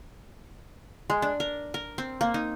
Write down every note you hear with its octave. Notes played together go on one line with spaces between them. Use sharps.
G#3
D4
A#4
A#4
C4
A#3
D#4